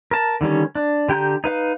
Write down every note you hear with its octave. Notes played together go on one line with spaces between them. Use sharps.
A#4 A5
D3 D#3 G3 C#4
D4
D3 G4 G5 A#5 G6
D#4 B4 F5